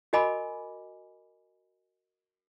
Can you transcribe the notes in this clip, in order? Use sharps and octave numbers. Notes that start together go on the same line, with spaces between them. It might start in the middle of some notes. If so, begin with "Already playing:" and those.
F#4 A#4 D#5 G#5 B5 D6